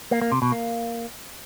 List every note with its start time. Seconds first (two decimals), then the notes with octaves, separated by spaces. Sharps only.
0.11 A#3
0.22 A#3
0.32 C3
0.42 B2
0.52 A#3